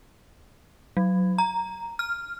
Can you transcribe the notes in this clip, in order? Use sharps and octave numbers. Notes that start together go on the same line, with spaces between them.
F#3
A#5
F6